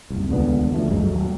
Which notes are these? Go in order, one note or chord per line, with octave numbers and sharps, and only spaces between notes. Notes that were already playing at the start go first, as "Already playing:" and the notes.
F#1 C2
D#1 C#2 D3 B3
D2 F3 G#3 A3
G2 F#3 G#3 A3
D#1 F#3